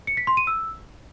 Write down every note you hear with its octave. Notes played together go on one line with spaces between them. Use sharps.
C#7
B6
C6
D#7
E6